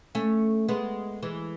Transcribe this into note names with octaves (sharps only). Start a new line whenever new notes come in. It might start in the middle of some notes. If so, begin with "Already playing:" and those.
A3 C#4
G#3 B3
E3 G#3